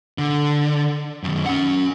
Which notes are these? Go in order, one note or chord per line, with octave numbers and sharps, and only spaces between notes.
D3
F#2 D#3
C#4 F#5